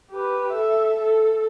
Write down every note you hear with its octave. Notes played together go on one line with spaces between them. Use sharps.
G4 B4
A4 E5
A4